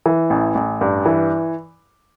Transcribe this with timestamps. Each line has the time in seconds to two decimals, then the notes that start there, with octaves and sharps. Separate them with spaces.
0.06 E3
0.30 A1
0.55 A1
0.81 G2
1.06 E3